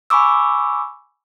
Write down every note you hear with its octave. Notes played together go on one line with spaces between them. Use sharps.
G#5 B5 C#6 D6 E6